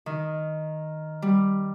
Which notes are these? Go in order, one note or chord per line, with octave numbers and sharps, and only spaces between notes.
D#3
G3